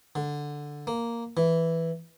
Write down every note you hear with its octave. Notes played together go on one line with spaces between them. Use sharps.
D3
A#3
E3